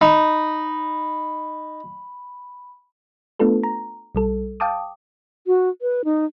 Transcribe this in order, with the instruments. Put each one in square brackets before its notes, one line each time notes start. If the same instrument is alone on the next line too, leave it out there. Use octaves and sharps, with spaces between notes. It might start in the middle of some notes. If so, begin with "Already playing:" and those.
[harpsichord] D#4 [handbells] B5
[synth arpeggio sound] A3 B3 D4 F4 A4 B4
A#5
B1 G3 A4
F5 G5 A5 D6 D#6
[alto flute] F#4
B4
D#4